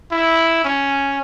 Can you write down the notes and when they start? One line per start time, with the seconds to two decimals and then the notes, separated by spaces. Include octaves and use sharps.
0.11 E4
0.64 C#4